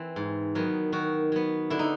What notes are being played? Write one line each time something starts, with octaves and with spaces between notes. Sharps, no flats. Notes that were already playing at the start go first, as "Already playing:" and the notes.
Already playing: E3 C4
G#2
D#3 F#3 B3
D#3 F#4
F#3 B3
D3 E4
D#4